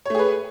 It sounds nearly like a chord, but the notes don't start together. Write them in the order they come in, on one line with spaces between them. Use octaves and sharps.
C#5 A3 G#4 B4